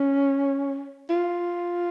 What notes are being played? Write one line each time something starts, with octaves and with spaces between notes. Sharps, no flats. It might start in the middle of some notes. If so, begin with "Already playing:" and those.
Already playing: C#4
F4